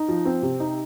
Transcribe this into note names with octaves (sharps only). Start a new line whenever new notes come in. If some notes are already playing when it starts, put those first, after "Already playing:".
Already playing: D#4
F3
C4
C3
D#4